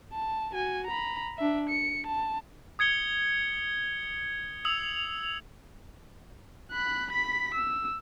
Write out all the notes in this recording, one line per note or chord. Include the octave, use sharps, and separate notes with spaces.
A5
F#4 G#5
A#5 B5
D4 E5
C#7
A5
D#6 G#6 C#7 G7
D#6 E6 F7 F#7
B5 F#6
B5 B6
E6